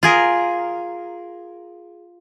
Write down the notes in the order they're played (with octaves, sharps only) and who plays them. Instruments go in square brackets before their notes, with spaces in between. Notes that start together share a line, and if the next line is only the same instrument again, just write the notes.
[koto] F4 G#4 A#4